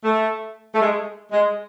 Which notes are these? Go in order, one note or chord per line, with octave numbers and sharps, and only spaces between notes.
A3
A3
G#3
G#3